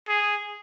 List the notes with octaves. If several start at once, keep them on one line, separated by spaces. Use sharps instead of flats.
G#4